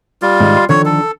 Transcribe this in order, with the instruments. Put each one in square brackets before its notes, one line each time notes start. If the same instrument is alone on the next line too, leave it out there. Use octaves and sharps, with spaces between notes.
[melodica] G3 F4
[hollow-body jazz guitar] G#2 D#3
C6
[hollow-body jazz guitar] D3 D#3 F3 [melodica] C#5
[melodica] A4